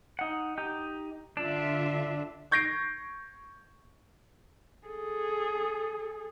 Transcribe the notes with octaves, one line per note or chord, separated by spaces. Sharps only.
D#4 F#5
D#4 G4
D3 D4 F4 E5
C#6 G6 G#6 A#6 C7 D7
G#4 A4